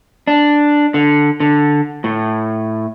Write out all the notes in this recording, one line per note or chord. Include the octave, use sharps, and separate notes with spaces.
D4
D3
D3
A2